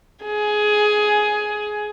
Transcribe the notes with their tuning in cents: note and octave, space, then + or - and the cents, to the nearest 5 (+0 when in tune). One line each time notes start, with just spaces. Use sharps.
G#4 +15